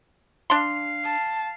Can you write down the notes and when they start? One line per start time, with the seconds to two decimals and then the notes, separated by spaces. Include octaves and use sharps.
0.50 D4 F5 C6
1.04 A5